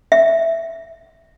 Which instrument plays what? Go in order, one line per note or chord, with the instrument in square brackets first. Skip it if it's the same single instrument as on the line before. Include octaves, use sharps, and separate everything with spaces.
[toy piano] E5